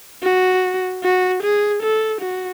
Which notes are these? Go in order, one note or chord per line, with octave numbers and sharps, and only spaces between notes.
F#4
F#4
G#4
A4
F#4